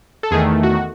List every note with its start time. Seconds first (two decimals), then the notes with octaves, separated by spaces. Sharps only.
0.23 A4
0.31 E2 D#3 A3 G#4
0.63 F#4